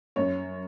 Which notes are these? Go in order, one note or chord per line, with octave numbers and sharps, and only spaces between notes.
F#2 C#5